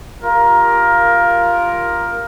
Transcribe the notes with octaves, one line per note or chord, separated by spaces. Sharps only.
F4 G4 A#4